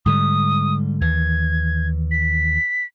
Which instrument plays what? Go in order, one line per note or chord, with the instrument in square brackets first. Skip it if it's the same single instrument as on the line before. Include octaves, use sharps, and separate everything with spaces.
[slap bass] G#2 D3 G3 [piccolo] D#6
[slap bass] D#2 E3 [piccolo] G#6
[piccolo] B6